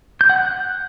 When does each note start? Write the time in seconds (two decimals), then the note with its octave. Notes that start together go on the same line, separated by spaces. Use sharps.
0.21 G6
0.30 F#5
0.38 F#6